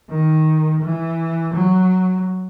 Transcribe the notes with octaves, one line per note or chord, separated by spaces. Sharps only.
D#3
E3
F#3